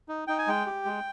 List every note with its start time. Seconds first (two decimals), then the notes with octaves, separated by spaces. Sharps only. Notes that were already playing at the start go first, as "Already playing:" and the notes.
0.09 D#4
0.27 D#4 G5
0.38 G#5
0.48 G#3 G5
0.66 G4
0.85 G#3